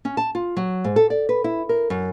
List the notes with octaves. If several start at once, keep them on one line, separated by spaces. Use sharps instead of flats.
C#4
A5
F4
F#3
G#2
A4
D5
B4
E4
A#4
F#2